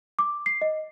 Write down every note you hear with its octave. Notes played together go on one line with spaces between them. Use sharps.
D6
C7
D#5